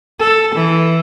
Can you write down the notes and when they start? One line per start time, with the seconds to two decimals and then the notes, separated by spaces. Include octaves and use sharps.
0.19 A4
0.55 E3